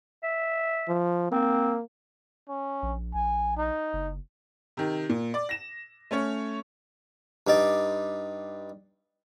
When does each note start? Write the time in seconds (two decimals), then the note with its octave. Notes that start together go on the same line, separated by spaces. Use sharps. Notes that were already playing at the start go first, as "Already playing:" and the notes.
0.23 E5
0.88 F3
1.32 A#3 C4
2.48 C#4
2.82 A#1
3.14 A#1 G#5
3.57 D#4
3.93 F#1
4.77 C3 D#3
5.09 A#2
5.34 D5
5.49 A#6 E7
6.11 A3 C#4 C#5
7.47 G2 D#4 D5